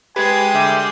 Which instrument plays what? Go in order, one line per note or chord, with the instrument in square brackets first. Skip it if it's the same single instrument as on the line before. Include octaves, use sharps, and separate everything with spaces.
[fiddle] G#3 C6 [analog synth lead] G4 [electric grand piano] B4 B5 [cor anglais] G#5
[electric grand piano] D3 E5 [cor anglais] G3